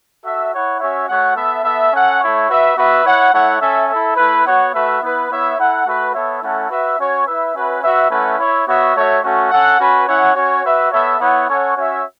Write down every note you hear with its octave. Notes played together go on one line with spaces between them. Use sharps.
F#4 A4 E5
E4 C#5 F#5
C#4 F#4 C#5 E5
A3 F#4 C#5 F#5
B3 A4 E5
B3 A4 E5
C#4 A4 F#5
A3 E4 C#5
F#4 B4 E5
B3 F#4 B4 E5
E4 C#5 F#5
A3 E4 C#5 F#5
C#4 A4 E5
E4 A4 E5
A3 E4 B4
B3 F#4 C#5 F#5
A3 F#4 B4 E5
B3 E4 B4
B3 E4 C#5 E5
E4 A4 F#5
A3 F#4 B4 E5
B3 A4 C#5 E5
A3 C#4 E4 A4 F#5
F#4 B4 E5
C#4 F#4 C#5
E4 B4 E5
C#4 F#4 B4 E5
F#4 B4 E5
A3 C#4 E4 B4 F#5
E4 C#5 E5
B3 F#4 C#5 E5
A3 F#4 C#5 E5
A3 C#4 F#4
C#4 A4 F#5
C#4 F#4 B4
C#4 E4 C#5 F#5
C#4 F#4 C#5
F#4 B4 E5
B3 A4 C#5 E5
B3 E4 C#5 F#5
C#4 A4 C#5 F#5
C#4 F#4 C#5 E5